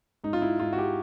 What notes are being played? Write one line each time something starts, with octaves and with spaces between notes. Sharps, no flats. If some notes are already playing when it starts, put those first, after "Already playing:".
G#2 D#4
F4
E4
G#2 F4
F#4
G4